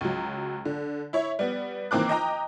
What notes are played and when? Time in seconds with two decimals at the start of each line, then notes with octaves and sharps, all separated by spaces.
0.01 C#2 F#3
0.65 D3
1.13 E4 C#5 E5
1.39 G3 B3
1.91 D#3 E3 A#3 C4 D6 F#6
2.09 D#5 G5 A#5 D6